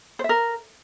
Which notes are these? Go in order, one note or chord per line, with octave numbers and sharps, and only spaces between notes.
C5
E5
A#4